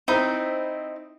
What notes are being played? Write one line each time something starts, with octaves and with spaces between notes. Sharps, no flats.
C4 D#4 E4 B5